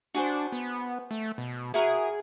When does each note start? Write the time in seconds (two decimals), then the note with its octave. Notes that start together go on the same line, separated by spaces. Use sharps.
0.15 D4 F#4 G#4 C5
0.52 B3
1.11 A3
1.38 B2
1.74 E4 F#4 G#4 A#4